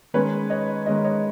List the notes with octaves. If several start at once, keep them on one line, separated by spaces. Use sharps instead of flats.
D#3 G#3 C#4 B4 C#5
C#5 D#5
D#3 G#3 C#4 C#5 D#5
C#5 D#5